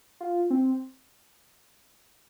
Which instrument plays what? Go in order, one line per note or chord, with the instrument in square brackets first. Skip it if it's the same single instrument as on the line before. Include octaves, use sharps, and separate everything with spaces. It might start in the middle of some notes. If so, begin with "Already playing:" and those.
[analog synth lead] F4
C4